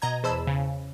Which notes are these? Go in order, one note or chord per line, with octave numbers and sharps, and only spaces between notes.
B2 D#5 A#5 G#6
E2 C5 A5 B5 E6 E7
C#3